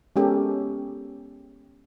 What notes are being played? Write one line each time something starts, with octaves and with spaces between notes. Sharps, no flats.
G#3 B3 C#4 G4 A4 A#4